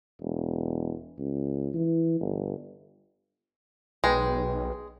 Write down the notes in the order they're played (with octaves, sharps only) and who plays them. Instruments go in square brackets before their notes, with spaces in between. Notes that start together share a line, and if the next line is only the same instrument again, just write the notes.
[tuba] E1
C#2
E3
G1
[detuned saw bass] B1 [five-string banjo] G#3 [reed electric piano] B4 G5